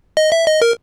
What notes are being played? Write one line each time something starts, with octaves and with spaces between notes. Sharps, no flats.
D#5
E5
D#5
A#4